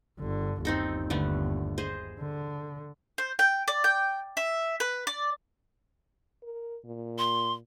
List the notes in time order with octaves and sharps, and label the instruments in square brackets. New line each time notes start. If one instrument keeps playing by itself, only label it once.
[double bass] G1 D3
[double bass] G1 D#2 [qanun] C4 D#4 A4
[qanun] D3 A3 B3
G#4 C5 D#5
[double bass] D3
[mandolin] C5
G5
D5
G5
E5
B4
D5
[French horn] A#4
A#2
[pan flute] C6